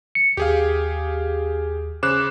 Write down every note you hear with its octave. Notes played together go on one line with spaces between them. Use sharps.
C#7
D#2 G4 G#4 F5
C#3 C5 D6 F#6 E7